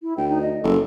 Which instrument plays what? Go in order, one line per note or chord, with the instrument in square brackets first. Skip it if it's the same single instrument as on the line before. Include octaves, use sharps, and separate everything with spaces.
[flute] E4
[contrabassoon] D2 [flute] G5
[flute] D#4
D#5
[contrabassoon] F#1 [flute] A4